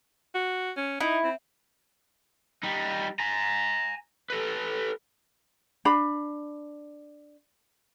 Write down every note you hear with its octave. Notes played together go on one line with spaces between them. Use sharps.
F#4
C#4
D#4 E4
C4
G3 D#4
G#5 A#5
A4 B4
D4 B5